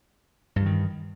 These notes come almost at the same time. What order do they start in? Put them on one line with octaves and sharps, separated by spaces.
G2 E3 D#3